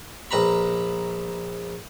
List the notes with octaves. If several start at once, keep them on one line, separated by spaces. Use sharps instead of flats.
A#1 B4 A#5 B5